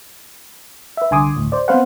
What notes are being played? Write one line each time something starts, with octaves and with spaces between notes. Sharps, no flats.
B4 E5
C2 D3 G#5 C6 D6 D#6
G#1 D2 A2
C5 D5
B3 C4 B4 C5 F5 F#5